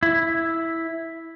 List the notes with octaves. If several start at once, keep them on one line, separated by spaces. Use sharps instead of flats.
E4